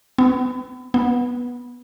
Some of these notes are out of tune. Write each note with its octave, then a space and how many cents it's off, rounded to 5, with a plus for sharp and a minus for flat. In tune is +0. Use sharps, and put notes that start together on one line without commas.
B3 +35
B3 -15